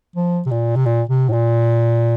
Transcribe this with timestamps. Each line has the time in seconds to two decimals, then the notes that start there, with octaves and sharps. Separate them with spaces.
0.16 F3
0.46 C3
0.51 A#2
0.76 C3
0.86 A#2
1.09 C3
1.29 A2
1.33 A#2